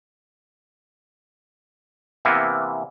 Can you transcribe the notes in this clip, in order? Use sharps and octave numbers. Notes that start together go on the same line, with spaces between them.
C3 E3 A#3 B3